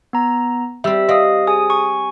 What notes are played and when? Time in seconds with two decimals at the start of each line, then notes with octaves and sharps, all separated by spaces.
0.13 B3 A#5
0.84 G3 C4 E5 E6
1.09 C4 D#5 F5 D#6
1.47 G#4 G#5 D#6
1.70 G#5 C#6